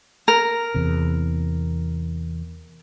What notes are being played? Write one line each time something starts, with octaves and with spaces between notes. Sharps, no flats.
A#4
E2 C3